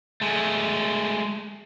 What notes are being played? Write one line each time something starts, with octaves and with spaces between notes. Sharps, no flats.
G#3 A3